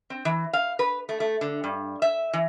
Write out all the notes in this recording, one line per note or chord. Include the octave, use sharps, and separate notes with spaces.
C4
E3
F5
B4
A3
A3
D3
G2
E5
E3